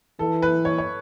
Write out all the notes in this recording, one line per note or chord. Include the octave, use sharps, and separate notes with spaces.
E3 A4
B4
C#5
C#5